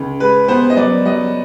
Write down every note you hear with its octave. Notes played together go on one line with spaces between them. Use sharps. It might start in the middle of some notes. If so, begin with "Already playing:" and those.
Already playing: C#2
G#3 B4
B3 C5
D#5
F#3 D5
F#3 D#5